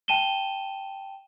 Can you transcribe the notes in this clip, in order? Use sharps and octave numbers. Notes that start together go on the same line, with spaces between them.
G5 A5 D#7 E7 G7